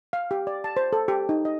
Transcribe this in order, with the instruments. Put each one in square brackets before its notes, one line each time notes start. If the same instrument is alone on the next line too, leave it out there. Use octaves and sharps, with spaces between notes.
[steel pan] F5
G4
D5
A5
C5
A4
G4
D#4
D#5